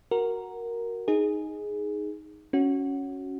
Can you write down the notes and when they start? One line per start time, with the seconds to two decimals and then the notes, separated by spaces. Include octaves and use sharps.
0.11 F#4 A#4
1.08 D#4 G#4
2.53 C#4 F#4